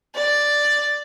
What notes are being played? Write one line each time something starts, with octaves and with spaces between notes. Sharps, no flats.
D5